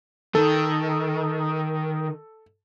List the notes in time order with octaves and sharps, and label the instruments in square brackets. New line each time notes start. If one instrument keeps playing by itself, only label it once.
[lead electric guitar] D#3 [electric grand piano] A4